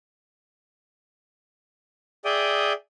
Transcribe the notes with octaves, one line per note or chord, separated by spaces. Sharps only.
G#4 D5 E5 G5 D#6